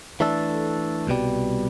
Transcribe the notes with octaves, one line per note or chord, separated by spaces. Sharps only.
E3 A3 D4 A4
C2 B2 G3